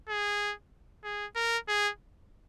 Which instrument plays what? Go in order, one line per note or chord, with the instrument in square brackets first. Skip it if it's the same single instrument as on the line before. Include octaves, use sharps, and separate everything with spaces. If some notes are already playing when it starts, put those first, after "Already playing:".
[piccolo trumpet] G#4
G#4
A#4
G#4